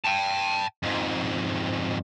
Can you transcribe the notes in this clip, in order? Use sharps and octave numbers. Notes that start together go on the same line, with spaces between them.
G5 A5
F2 G#2